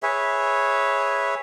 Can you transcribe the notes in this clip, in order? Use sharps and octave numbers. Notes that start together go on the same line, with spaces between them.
G#4 B4 C#5 E5